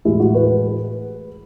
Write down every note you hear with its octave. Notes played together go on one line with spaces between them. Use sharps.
A2 E3 G#3 E4
F#4
B4